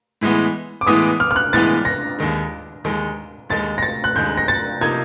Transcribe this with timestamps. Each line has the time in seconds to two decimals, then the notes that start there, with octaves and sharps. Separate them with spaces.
0.21 A2 E3 G#3 B3
0.81 D6
0.87 A2 E3 G#3 B3 D#6
1.20 F6
1.31 F6
1.36 F#6
1.53 A2 E3 G#3 B3 A6
1.85 A#6
2.19 D#2 D#3 G#3
2.84 D#2 D#3 G#3
3.49 D#2 D#3 G#3 A6
3.78 A#6
3.83 A6
4.04 F#6
4.15 D#2 D#3 G#3 G6
4.37 A#6
4.48 A6
4.81 C3 F3 A#3 D#4 G#6